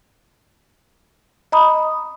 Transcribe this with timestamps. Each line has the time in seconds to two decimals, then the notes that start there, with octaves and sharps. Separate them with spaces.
1.52 D#5 A#5 B5 D#6